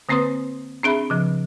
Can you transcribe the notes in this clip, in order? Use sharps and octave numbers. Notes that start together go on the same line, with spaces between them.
D3 A#3 C4 B4 C6 D#6
C4 D4 G#4 E5 B5
C#3 F3